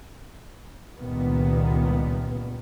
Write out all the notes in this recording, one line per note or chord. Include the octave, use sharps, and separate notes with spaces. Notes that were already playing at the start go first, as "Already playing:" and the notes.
C#2 G2 A#2 D#3 B3